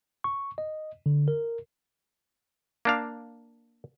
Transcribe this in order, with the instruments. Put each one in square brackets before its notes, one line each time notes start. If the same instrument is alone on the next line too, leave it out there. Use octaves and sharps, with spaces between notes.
[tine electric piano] C#6
D#5
D3
A#4
[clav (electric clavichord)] A#3 D4 F5